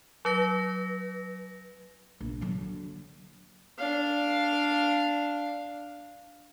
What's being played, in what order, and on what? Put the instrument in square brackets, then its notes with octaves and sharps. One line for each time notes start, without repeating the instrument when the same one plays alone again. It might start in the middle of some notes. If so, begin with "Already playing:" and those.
[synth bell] F#3 B4 A#6
[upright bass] A#1
D3 F#3
[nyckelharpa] D4 F5